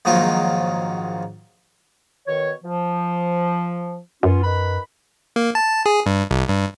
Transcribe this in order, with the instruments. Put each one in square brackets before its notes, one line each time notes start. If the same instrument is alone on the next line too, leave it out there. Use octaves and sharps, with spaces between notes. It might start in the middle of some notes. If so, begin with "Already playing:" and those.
[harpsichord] A#1 G#2 D#3 F#3 F4
[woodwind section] B2 D#3 C#5
F3
[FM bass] F#2 [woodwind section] B3 C#4 F4
[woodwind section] D#3 B4 B5
[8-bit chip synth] A#3
A5
G#4
G2
C2
G2